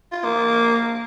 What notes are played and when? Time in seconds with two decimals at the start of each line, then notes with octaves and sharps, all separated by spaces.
0.12 F4
0.24 A#3